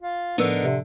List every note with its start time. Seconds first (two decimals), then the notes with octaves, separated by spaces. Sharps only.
0.02 F4
0.38 A2 D3 F3 B3 D#4 A#4 E6
0.61 C3